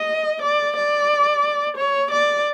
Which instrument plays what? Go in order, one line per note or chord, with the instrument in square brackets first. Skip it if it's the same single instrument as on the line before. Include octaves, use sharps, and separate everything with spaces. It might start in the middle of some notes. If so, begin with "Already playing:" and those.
Already playing: [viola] D#5
D5
D5
C#5
D5